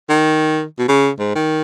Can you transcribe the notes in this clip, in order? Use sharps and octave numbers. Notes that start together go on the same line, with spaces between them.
D#3
B2
C#3
G#2
D#3